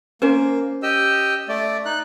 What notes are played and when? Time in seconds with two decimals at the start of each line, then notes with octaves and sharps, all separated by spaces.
0.22 A#3 C#4 A#4 C5
0.83 G4 D#5 E6
1.49 A3 D5
1.86 D#4 F#6